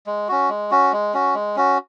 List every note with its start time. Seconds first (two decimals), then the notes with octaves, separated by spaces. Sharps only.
0.07 G#3
0.29 C#4 F#4
0.49 G#3
0.71 C#4 F#4
0.92 G#3
1.14 C#4 F#4
1.35 G#3
1.56 C#4 F#4